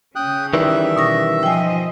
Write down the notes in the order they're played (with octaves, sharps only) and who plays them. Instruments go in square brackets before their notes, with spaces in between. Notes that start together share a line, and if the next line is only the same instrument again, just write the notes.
[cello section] C#3 C#4 [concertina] G5 D#6 F#6
[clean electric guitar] D#3 E3 G3 [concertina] E5
[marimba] B2 C#6 A#6
[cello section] F3 D#5 [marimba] G5 G#5